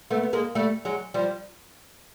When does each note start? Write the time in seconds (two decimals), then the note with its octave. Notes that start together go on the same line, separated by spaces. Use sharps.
0.11 A3 B3
0.23 B3
0.33 G#3 A#3
0.55 G3 A3
0.85 F#3 G#3
1.14 F3 G3